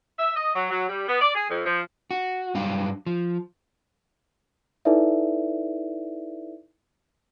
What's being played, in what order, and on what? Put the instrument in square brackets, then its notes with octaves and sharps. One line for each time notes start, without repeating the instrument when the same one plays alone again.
[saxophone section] E5
D#5
F#3
F#3
G3
B3
D5
G#4
F2
F3
[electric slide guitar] F#4
G2 F#3 G3 D4 F5
F3
[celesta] D#4 E4 A4 B4 D5 E5